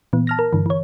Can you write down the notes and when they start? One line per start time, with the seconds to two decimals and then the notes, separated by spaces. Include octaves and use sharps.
0.13 A#2 E3 B3
0.27 A5 F6 A#6
0.39 A#4
0.53 G2 D3 E3
0.66 E3 C#5